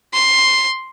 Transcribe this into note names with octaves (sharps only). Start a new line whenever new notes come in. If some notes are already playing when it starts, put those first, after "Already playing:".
C6